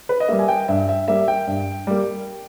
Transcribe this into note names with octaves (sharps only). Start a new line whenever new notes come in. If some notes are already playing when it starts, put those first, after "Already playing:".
B4
D#5
G3 A#3 E5
G#5
G5
G2 E5
E5
G3 A#3 E5
G5
G2
G3 A#3